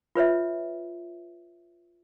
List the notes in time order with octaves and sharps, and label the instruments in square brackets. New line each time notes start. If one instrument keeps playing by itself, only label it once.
[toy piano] F4 B4 C#5 E5